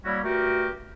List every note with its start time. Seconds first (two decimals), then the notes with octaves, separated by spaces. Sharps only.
0.04 F#3 G3 A#3 C#4 E4 F#4
0.24 G2 A3 F#4 G4 A#4